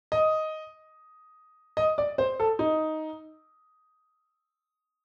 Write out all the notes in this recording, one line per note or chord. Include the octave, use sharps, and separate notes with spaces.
D#5
D#5
D5
C5
A4
D#4